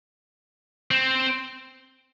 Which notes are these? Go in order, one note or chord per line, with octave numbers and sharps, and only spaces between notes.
C4